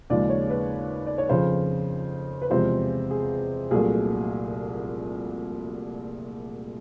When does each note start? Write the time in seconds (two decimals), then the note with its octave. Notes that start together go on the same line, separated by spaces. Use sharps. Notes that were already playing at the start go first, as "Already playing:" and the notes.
0.10 D#2 C#3 F3 G#3 D5
0.30 C#5
0.50 B4
1.06 D5
1.18 C#5
1.29 F2 C#3 F3 C5
2.42 B4
2.50 E2 C3 F3 G#3 C5
3.11 G#4
3.71 C2 A#2 F#3 A3 G#4